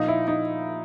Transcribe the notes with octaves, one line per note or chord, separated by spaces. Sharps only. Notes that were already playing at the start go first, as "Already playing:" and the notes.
Already playing: A#2 F3 D#4
E4
D#4